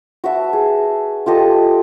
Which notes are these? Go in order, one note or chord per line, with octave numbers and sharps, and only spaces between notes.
F#4 B4 E5 A5
G#4
F4 G4 A4 D#5